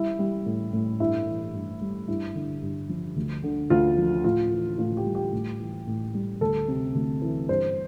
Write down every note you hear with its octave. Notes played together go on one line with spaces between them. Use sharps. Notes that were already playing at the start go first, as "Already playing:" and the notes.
Already playing: G3 E4
G3
A2
A2
G2 E4
E3
G2
G3
G2 E4
D3
G2
F3
D2
D3
D2 F4
F3
A2 F4
E3
A2 F4
G4
G3
G4
A2
E3
A2
G3
D2 A4
C3
D2
E3
G2 C5